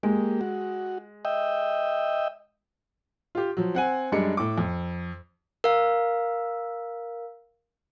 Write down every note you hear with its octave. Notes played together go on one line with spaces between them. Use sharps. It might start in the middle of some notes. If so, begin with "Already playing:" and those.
G#3 A#3 G4
F#4
D#5 E5 G5
F4 G4
F3 F#3
C4 F#5 G#5
F#2 G3 G#3 D4 C#7
A2 D6
F2
A#4 F5